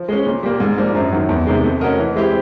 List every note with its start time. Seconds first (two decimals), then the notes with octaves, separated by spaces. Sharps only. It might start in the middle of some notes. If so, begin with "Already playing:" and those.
Already playing: F3
0.08 G#3 C#4
0.26 A#2
0.43 G3 A#3
0.60 G#2
0.78 F3 A#3 D4
0.95 F#2
1.12 D#3 F#3
1.29 E2
1.47 C3 D#3 G#3
1.64 A3
1.81 C#4 F#4 A#4 D#5
1.99 E3
2.16 G#3 C4 E4 G4